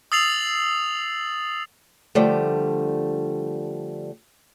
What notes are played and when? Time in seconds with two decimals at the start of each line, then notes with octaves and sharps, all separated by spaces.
0.12 D#6 E6 A6 C7 F7 F#7
2.15 D3 F3 G3 A3